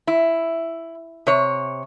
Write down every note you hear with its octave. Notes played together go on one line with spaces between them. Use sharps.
E4
C3 C#5